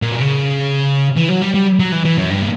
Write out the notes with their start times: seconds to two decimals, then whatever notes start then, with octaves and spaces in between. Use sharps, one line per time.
0.02 A#2
0.12 B2
0.21 C#3
1.16 E3
1.29 F#3
1.41 G3
1.54 G3
1.80 F#3
1.92 E3
2.05 E3
2.17 F#2
2.30 G2
2.41 A#2